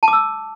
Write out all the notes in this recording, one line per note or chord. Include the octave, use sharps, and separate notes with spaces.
A5
D6
E6